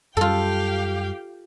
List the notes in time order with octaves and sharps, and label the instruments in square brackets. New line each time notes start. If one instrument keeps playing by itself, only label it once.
[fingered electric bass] F#2 G3 [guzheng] F4 A4 [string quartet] G4 F5 G5